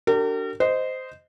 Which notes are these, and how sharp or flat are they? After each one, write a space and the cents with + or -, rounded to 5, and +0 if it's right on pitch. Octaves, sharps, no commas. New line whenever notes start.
D4 +0 G4 -40 A#4 -40
C5 -15 D#5 +0